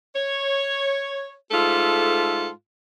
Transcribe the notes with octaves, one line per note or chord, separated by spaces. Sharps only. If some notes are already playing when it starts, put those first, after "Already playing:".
C#5
G#2 A3 F4 A4